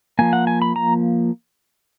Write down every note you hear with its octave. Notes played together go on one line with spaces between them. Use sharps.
F3 A#3 G#5
F#5
G#5
B5
A#5